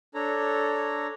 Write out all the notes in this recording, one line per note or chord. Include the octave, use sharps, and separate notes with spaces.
D4 A4 C#5 A#5